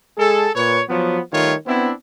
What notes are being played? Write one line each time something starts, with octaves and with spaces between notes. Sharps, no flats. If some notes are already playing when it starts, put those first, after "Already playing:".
G#3 G#4 A4
A#2 B4 C#5
F3 F#3 B3
D#3 G3 A3 F4 C#5
B3 C4 D4 E4